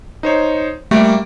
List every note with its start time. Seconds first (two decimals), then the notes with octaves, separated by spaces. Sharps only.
0.23 D#4 C5 C#5
0.91 G3 A3 A#3 D7